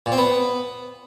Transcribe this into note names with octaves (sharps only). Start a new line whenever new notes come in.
A#2
C4
B3